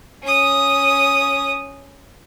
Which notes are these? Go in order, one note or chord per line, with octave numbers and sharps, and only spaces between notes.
C#4 D#6